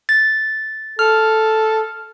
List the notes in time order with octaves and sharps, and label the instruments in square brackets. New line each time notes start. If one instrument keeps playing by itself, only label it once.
[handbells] A6
[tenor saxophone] A4 [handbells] F6